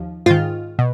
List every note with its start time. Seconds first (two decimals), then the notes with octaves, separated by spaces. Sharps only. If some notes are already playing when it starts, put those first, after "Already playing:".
Already playing: D#2 F3
0.26 G#2 D#3 F4
0.79 B2